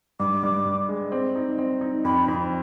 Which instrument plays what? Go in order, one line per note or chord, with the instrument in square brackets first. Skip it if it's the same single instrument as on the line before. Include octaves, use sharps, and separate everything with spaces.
[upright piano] G2 [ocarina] D6
[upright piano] G2
G2
G#3
C4
D#4
C4
D#4
[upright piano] F2 [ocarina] B5
[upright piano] F2